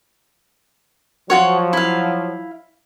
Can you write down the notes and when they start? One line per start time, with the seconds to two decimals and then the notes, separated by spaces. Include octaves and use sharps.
1.30 F3 F#3 F4 F#4 C#5
1.73 E4 F5